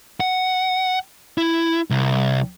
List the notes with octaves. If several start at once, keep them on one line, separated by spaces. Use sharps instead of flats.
F#5
E4
C2